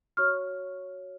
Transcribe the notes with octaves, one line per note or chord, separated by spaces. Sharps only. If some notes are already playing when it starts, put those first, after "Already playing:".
F#4 C#5 C#6 F6